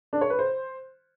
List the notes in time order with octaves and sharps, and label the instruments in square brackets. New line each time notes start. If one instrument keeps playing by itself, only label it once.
[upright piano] D4
C#5
B4
C5